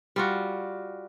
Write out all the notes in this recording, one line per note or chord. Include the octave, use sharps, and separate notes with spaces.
G3 F4 F#4